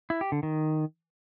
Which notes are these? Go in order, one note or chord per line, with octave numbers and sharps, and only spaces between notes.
E4
G4
D3
D#3